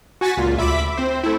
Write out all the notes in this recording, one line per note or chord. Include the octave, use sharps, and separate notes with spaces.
F#4 G#5 C#6 A6 B6
C#2 A#2 F4
D2 E5 B5 D6 B6
C4 C5
A3 E4